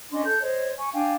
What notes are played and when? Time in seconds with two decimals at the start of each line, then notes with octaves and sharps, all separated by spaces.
0.11 C#4 D4 D#5 C6
0.24 A4 G6
0.41 C5 C#5 D#5
0.78 G#5 C#6
0.93 D4 F5 G5 G#5